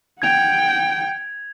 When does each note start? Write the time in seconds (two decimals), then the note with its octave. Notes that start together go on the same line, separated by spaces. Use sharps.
0.22 F#5 G5 G#6 F7